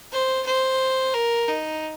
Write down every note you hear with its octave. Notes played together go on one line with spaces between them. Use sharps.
C5
C5
A#4
D#4